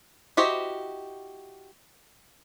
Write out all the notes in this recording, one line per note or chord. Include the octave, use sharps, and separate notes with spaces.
E4 F#4 G4 C5 D#5